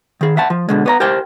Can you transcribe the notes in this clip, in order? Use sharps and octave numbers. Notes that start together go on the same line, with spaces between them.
D#3 G#4
E5 F#5 A5
F3
B2 D3 G#3
B3 C#5 A#5
G4 A#4 C5 G5